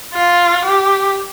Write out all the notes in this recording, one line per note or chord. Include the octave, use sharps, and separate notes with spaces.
F4
G4